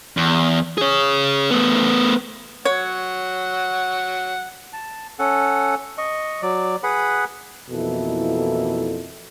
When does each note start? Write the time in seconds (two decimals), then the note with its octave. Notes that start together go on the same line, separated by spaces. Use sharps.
0.17 E2
0.78 G#4 C#5
1.51 A3 B3
2.65 F#3 C#5 F#5
4.73 A5
5.19 C#4 A4 F#5
5.98 D#5 C#6
6.42 F#3 D5
6.83 G#4 B4 F#5 B5
7.70 F2 B2 E3 A#3 E4 A4